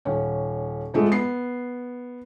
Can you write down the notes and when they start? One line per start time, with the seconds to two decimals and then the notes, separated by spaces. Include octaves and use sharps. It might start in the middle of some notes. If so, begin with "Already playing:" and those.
0.05 D#1 C#4
0.94 G#2 F3 G#3 A3
1.12 B3 C7